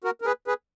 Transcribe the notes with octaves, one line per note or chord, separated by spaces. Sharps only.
F#4 A#4
A#4
G#4 B4
G#4 B4